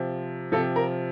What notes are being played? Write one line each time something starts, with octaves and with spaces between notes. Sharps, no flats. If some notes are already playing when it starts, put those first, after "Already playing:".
Already playing: C3 F3
C3 F3 A4
A#4